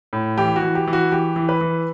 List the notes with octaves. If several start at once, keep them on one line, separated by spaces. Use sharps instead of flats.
A2
E3 G4
F#4
E3
G4
E3
F#4
E3 G4
E3
B4
E3